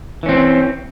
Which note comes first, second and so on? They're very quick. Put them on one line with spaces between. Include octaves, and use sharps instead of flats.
E3 C#4 C4